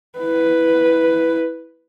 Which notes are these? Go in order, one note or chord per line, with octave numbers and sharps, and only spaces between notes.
E4 B4